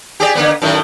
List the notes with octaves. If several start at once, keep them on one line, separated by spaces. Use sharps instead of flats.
G4 G#4 D5
D3 A#3 B3
F#2 A2 D#3